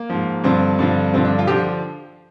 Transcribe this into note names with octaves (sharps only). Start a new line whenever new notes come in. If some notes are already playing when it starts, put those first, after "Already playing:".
Already playing: A#3
G#2 F3
G2 D3 F3 C4
G2 D3 F3
G2 D3 F3 C4
D4
F4
D3 F3 G4